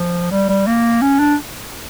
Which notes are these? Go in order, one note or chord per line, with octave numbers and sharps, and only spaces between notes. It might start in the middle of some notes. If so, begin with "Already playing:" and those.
Already playing: F3
G3
G3
A#3
C#4
D4